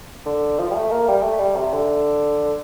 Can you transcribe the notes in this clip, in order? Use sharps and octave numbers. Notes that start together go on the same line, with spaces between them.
D3
F3
G3
A3
A#3
G3
A3
G3
C3
D3